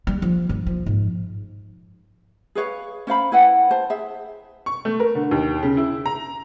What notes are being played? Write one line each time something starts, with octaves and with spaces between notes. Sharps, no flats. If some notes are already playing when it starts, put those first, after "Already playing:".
G3
F3
G2
F3
G#2
G#4 B4 C#5 F5
C#4 C5 F5 B5
E4 B4 F#5 G5
C5 A5
G#4 E5
C#6
A3
A#4
D3
D#2
C#3
E4
A#5